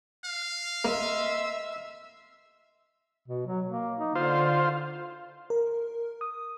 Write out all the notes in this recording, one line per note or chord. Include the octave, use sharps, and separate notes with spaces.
F5
A#3 D#5 E5 C6 E6
B2
F#3
A#3
D#4
D3 F4 C5
A#4
D#6